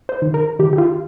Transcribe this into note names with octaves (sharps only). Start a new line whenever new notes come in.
C5
D#3
A#4
D#3 G4
G4
F4